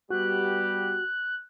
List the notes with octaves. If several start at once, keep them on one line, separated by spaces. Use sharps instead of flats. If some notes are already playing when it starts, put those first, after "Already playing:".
G3 B3 F#4 G4 F#6